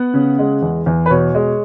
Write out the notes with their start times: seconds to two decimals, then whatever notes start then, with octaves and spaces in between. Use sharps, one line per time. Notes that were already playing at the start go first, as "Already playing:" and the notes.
Already playing: B3 F#5
0.14 C#3
0.39 G#3
0.62 E2
0.86 E2
1.06 B4
1.10 B2 C#5
1.35 G#3